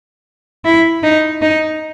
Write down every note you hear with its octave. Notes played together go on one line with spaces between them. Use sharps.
E4
D#4
D#4